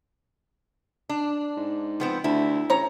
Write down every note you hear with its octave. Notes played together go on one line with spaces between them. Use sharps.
D4
G#2
F3 B3 C4
D2 E4
A1 C#5 A#5